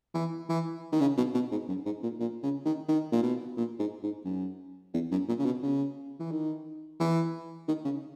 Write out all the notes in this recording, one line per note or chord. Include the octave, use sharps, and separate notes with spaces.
E3
E3
D#3
C#3
B2
B2
G#2
F#2
G#2
A#2
A#2
C#3
D#3
D#3
A#2
B2
A#2
G#2
G#2
F#2
E2
F#2
A#2
C#3
B2
C#3
E3
D#3
E3
D#3
C#3